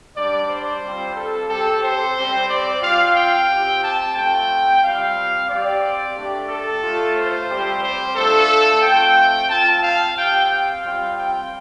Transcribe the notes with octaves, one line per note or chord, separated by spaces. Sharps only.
G3 D4 G4 D5
C5
G3 C4 F4
A4
C4 G4 A4
C5
G3 C4 G4
D5
C4 F4 F5
G5
C4 G4
A5
A3 C4 F4 G5
G3 C4 F4 F5
C4 G4 D5
A3 D4 G4
A4
A3 F4
C5
G3 C4 G4
C5
A3 D4 F4 A4
A3 C4 F4 G5
C4 F4 A5
F5
C4 G4 G5
F5
G3 C4 F4
G5